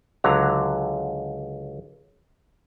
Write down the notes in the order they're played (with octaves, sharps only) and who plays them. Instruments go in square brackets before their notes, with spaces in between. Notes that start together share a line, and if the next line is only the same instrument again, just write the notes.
[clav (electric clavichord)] C#2 D3 F#3 A#5